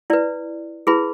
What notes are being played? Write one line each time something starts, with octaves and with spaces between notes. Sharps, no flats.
E4 B4 D5
E4 G#4 B4 B5